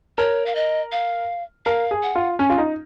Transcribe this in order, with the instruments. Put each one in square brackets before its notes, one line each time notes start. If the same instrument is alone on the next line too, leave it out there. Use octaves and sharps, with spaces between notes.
[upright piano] A#4 [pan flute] C#5
[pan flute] F5
D#5
F5
[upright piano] A#4 [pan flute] F5
[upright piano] G#4
[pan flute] F#5
[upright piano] F4
C#4
F4
D#4